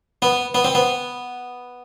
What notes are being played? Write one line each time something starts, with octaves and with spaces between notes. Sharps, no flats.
B3
B3
C4
B3